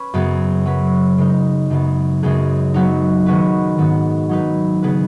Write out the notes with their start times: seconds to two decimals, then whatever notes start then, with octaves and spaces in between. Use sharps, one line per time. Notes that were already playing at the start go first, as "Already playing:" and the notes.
Already playing: C#4 B4
0.14 F#2 C#3 B3 G#4
0.66 F#3 C#4 B4
1.18 C#3 G#3 D#4
1.70 F#2 C#3 B3
2.22 F#2 C#3 G#3 B3 G#4
2.74 F#3 B3 D#4
3.26 D#3 G#3 C#4 F#4 B4
3.78 G#2 D#3 B3
4.29 F#3 D#4 B4
4.82 C#3 B3 G#4 B4